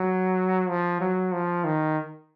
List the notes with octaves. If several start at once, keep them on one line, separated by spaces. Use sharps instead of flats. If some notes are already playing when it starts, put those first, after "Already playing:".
Already playing: F#3
F3
F#3
F3
D#3